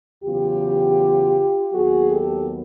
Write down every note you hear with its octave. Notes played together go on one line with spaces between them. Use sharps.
E2 C#3 F#3 B3 F4 G4
D#2 D#3 F#3 B3 F#4 G#4
G4 A4